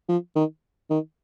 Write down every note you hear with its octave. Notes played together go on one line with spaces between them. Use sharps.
F3
D#3
D#3